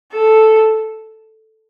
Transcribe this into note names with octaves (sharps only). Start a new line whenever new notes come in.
A4